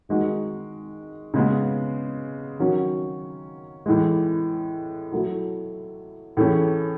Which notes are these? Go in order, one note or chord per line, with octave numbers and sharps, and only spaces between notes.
D#3 G#3 D#4 F#4
C#3 G#3 B3
D#3 F#3 C#4 F#4
A2 E3 G#3
F#3 A3 E4
A2 E3 A3 C#4 G#4